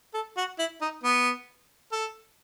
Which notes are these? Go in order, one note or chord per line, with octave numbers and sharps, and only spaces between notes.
A4
F#4
E4
D#4
B3
A4